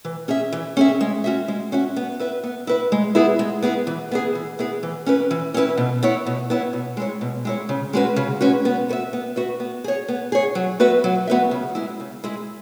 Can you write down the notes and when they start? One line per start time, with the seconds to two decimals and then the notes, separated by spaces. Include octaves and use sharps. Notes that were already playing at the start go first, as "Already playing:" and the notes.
0.05 E3
0.28 C#4 G#4 E5
0.52 E3
0.77 C#4 G#4 E5
1.01 G#3
1.24 C#4 F#4 E5
1.48 G#3
1.72 C#4 F#4 E5
1.96 B3
2.19 E4 B4 E5
2.43 B3
2.67 E4 B4 E5
2.92 G#3
3.15 B3 E4 G#4
3.39 G#3
3.62 B3 E4 G#4
3.87 E3
4.11 B3 E4 G#4
4.35 E3
4.59 B3 E4 G#4
4.83 E3
5.06 C#4 E4 B4
5.31 E3
5.54 C#4 E4 B4
5.77 B2
6.03 B3 E4 C#5
6.26 B2
6.50 B3 E4 C#5
6.73 B2
6.97 G#3 E4 C#5
7.21 B2
7.45 G#3 E4 C#5
7.69 C#3
7.93 G#3 C#4 F#4 B4
8.16 C#3
8.41 G#3 C#4 F#4 B4
8.65 B3
8.89 F#4 B4 E5
9.13 B3
9.36 F#4 B4 E5
9.60 B3
9.84 G#4 C#5
10.08 B3
10.32 G#4 C#5
10.55 F#3
10.80 B3 F#4 B4 E5
11.04 F#3
11.27 B3 F#4 B4 E5
11.51 C#3
11.75 G#3 E4 G#4
12.00 C#3
12.24 G#3 E4 G#4